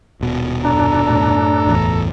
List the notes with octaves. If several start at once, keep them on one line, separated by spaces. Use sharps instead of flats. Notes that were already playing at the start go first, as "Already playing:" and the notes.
D#1 B2
F#2 D4 A4 A#5
F#2 A2
E1 A1 E2